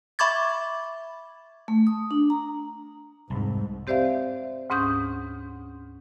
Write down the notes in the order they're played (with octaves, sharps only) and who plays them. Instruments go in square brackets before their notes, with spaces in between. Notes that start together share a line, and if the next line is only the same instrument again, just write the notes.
[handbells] E5 B5 C#6 D6 G#6 A6
[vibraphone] A3
D#6
D4
A#5
[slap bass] C2 F2 [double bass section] G#2
[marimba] C4 G4 C5 D5 E5 F5
D2 G#2 C#4 D#6 G6